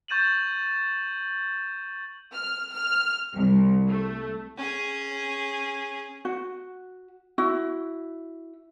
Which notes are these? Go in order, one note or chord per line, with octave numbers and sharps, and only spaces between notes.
C#6 G6 A6 D#7 E7 F#7
F6
F6
C2
A3
C#4 G#4
F#4
E4 F#4